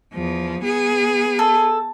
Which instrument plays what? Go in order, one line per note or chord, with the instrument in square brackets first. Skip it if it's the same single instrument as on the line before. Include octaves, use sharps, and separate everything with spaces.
[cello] E2 F3
B3 G#4
[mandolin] A4